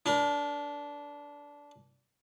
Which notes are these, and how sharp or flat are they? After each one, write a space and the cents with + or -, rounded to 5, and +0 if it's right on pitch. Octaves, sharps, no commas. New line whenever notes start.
D4 -15 A#4 +35